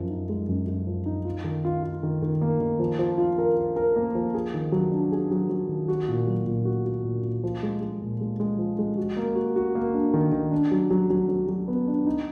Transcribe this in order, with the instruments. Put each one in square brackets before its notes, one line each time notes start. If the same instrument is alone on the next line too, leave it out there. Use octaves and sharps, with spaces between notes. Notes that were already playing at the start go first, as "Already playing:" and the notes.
Already playing: [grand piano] F#2 F3
D#4
G#3
F#2
F#2
F3
D#4
F4
D#3
F4
F4
D#3
D#3
A#3
D#3
F3
F3
F4
A#4
A#4
A#4
A#3
F3
G#4
D#3
F#3
D4
G#4
F#3
F#3
D#3
F#4
A#2
F#3
A#2
F#4
F#4
A#2
A#2
F3
G#3
G#3
A#2
G#3
G#3
F3
G#3
F#4
A#3
F#4
F#4
A#3
D4
D#3
D#3
D4
F#3
F#3
F#3
F#3
F#3
B3
D4
D#4